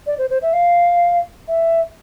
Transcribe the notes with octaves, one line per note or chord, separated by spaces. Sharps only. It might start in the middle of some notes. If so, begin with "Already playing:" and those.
D5
C5
C5
E5
F5
E5